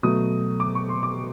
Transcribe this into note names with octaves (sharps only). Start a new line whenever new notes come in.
B2 F#3 A3 D#6
D6
C#6
C6
D6